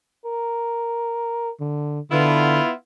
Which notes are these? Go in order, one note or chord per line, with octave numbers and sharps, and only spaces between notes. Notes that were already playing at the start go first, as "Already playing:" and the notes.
A#4
D3
D3 B3 E4 F4